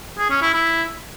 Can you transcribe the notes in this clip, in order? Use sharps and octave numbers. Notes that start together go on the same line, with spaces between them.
G#4
C#4
E4
E4